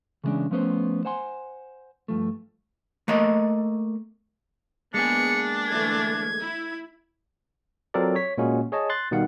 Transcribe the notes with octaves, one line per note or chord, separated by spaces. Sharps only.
C#3 E3 G3 G#3 C#4 D4
F3 A3 B3 C#4 C5
C5 F#5 G#5 C6
G2 F3 A3
A3 A#3 D#5
G#3 A#3 B3 D4 G#4 C#7
D3 E3 A3 G#6
E4
F#3 C4 F4 A4 A#4 D5
C#5 B6
A#2 G#3 A#3 C#4 F#4
G#4 C#5 D#5 A5
C6 F#6 A6
B2 D#3 G3 F5 F#5